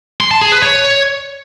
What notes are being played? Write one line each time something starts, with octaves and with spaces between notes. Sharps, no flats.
C6
A5
G#4
B4
C#5